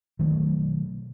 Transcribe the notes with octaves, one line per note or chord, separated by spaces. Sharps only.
B2 D#3 F#3 A3